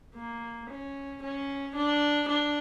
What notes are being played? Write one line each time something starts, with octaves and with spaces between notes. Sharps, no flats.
A#3
C#4
C#4
D4
D4